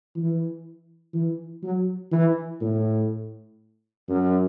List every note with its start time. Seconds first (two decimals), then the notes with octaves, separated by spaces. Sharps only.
0.16 E3
1.14 E3
1.63 F#3
2.12 E3
2.61 A2
4.08 F#2